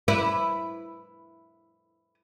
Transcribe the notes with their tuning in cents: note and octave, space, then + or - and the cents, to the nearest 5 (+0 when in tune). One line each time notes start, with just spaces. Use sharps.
E4 +5 B4 +0